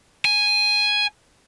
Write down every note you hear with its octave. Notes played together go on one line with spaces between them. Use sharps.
G#5